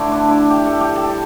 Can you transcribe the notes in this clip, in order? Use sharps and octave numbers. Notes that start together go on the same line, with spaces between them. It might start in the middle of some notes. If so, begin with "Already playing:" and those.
Already playing: D3 A3 E4 A4 C5
D4
E4
G4
A4
G4
A4
G3